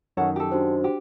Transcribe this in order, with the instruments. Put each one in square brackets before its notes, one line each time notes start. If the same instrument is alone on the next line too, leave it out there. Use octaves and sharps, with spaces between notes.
[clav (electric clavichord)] F#2 D#3 [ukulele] A4 C#5 F#5
[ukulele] G4 A4
[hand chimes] D4 F#4 C5
[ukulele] G4